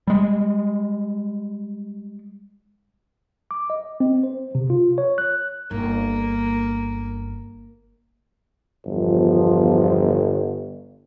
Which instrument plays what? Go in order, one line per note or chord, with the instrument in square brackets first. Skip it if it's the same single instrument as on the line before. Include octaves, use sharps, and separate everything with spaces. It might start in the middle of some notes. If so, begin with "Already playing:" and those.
[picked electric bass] G3 G#3
[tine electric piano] D6
D#5
C4
C5
C3
F4
C#5
F#6
[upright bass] G1 [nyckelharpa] A#3
[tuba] G1 [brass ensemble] E2 F3